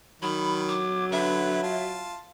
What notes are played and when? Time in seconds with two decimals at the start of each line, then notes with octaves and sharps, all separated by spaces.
0.22 D#3 F#3 B5
0.68 D6
1.12 D3 B4 E5
1.63 F4 A5